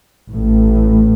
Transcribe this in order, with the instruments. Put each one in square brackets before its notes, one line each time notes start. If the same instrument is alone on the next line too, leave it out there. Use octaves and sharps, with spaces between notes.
[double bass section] A1 A2